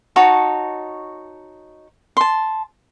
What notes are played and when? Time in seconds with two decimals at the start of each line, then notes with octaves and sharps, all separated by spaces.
0.16 D#4 F#4 C#5 A5
2.17 A5 C6